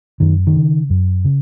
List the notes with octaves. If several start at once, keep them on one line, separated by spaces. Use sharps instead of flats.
F#2 D#3
D#3
C#3
F#2
C#3